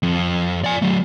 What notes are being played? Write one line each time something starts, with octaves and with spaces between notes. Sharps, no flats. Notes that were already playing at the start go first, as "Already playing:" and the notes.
F2
D5 G#5
F#3 A3